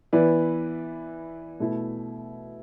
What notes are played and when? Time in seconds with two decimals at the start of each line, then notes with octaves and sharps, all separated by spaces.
0.13 E3 B3 E4 B4 D5
1.60 B2 A3 E4